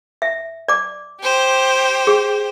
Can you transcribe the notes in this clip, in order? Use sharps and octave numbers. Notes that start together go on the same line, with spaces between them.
E5
D5 D6
G4 C5
G#4